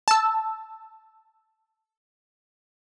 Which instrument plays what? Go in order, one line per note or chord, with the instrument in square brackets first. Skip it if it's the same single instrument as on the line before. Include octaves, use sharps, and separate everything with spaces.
[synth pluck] A5 E6